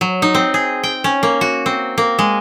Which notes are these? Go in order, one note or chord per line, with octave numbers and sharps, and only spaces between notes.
F#3
D#4
C4
G#4
G5
C#4
A#3
F#4
C4
A#3
G#3